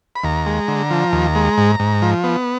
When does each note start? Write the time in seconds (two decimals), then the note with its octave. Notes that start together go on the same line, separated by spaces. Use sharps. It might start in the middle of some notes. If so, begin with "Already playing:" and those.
0.16 B5
0.24 D#2 A#5
0.46 G#3
0.68 D3
0.91 F3
1.13 D#2
1.35 G#3
1.58 G#2
1.80 G#2
2.02 F3
2.24 B3